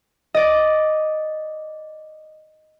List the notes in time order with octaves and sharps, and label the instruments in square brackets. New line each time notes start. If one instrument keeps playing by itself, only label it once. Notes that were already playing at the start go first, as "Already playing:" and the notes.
[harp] D5 D#5